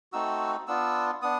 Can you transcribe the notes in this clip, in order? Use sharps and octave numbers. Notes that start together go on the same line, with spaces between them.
A3 C4 D#4 F#4 E6
B3 D4 F4 E6
B3 D4 D#6